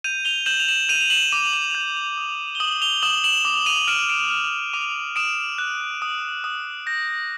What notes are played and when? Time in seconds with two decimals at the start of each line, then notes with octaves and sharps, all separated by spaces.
0.04 G6 D#7 F7
0.25 F7 G7
0.46 G6 E7 F#7
0.60 F7
0.68 E7 F#7
0.89 G6 D#7 F7
1.01 F7
1.10 E7 F#7
1.31 D6 D#7 F7
1.53 E7 F#7
1.75 G6
2.17 D#6
2.55 G7
2.60 D#6 E7 F#7
2.82 F7 G7
3.02 D#6 E7 F#7
3.24 E7 F#7
3.45 D6
3.66 D#7 F7
3.87 F6 D7 E7
4.09 D7 E7
4.30 F6 E7 F#7
4.73 D6 D#7 F7
5.16 D#6 D7 E7
5.58 F#6
6.02 D#6
6.44 D#6
6.86 G6 A#6
7.08 A#6